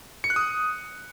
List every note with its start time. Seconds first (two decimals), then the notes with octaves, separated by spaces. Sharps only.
0.24 C#7
0.30 F#6
0.36 D#6